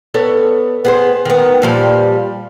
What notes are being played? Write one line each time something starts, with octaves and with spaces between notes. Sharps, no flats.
B3 A4 C#5
B3 G#4 C5
D#3 B3
A#2 F3 G3